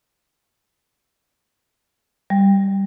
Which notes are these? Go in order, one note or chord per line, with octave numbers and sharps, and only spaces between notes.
G3